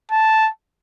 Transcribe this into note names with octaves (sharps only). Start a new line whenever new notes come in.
A5